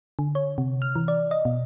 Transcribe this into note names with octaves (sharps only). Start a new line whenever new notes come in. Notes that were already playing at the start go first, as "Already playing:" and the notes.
D3
C#5
C3
F6
E3
D5
D#5
B2